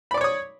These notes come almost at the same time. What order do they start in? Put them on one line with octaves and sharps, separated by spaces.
B5 D5 D6 C#5 D#6